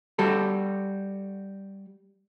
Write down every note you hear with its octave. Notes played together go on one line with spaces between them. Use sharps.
G3 F#4 A4